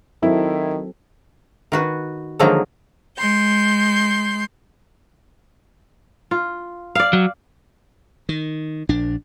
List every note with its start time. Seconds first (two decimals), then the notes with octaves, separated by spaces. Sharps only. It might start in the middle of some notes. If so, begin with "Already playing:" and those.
0.23 D#3 F#3 C4 E4 A4
1.72 D#3 F#4 B4
2.39 D3 D#3 F3 F#3 G#3 A#3
3.18 G#3 C6 G6
6.31 F4
6.95 D5 F5
7.13 F#3
8.29 D#3
8.89 A#1 D4